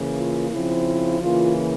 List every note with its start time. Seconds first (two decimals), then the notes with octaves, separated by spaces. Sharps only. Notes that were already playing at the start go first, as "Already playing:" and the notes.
Already playing: C#3 E3 A#3
0.16 F4
0.51 C#3 F3 C4 E4
1.21 C#3 E3 A#3 F4